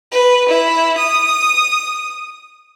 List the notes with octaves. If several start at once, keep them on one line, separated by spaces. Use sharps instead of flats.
B4
E4
D#6